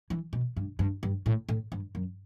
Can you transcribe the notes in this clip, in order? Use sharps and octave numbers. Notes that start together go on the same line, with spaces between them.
E3
B2
G2
G2
G2
A2
A2
G2
F#2